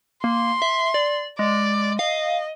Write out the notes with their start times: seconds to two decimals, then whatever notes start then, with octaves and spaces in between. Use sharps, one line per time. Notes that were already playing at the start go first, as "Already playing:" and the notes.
0.24 A#3 C6
0.62 E5
0.94 D5
1.39 G#3 D5
1.99 D#5 F5